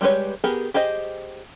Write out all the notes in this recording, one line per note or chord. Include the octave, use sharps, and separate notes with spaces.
G3 G#3 G4 B4 C#5
B3 G4 G#4 A#4
G4 G#4 C5 D#5